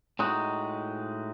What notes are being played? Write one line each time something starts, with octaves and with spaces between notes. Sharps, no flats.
A2 G#3 D#4 F#4